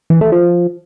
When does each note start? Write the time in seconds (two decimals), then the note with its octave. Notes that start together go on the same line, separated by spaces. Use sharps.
0.10 E3
0.21 A3
0.32 F3